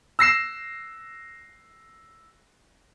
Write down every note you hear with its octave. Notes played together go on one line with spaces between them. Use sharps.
E6 A#6 C7 E7